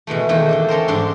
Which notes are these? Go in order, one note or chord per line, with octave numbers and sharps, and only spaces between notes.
B2 E3 G#3 A3
E2 D#3 A3 A#3
D4 A4 G5
C#4 A4 A#4 C5
G#2 D4 C6